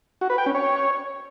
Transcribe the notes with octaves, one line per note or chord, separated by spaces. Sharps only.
F#4
B4
G5
C#4
C#5